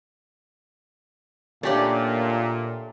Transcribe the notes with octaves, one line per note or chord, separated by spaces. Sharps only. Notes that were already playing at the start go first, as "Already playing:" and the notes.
A#2 A3 C#4 D4 G4 D5